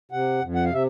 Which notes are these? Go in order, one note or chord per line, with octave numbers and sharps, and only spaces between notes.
C3 F#5
F2
F#5
F5
C3 E5